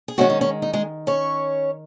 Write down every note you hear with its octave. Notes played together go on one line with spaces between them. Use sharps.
G#4
D#3 F#3 G#3 C#4 F#4
D#4
C#4
D#4
G#3 G#4
C#4 C#5